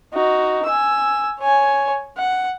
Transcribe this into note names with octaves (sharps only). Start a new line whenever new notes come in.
D#4 F#4
G#5 E6
C#5 G#5
F#5